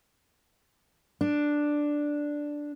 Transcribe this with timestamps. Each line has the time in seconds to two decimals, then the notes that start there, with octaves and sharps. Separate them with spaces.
1.21 D4